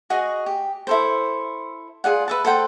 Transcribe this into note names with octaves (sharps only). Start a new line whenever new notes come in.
F#4 G#4 D#5
G4
E4 A4 C5
F4 G#4 D5 F#5
B4 E5 A5
A4 C5 F#5 G5